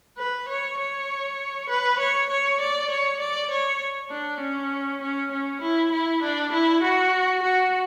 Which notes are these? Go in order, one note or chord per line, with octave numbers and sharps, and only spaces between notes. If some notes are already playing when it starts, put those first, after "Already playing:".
B4
C#5
C#5
B4
C#5
C#5
D5
C#5
D5
C#5
D4
C#4
C#4
C#4
E4
E4
D4
E4
F#4
F#4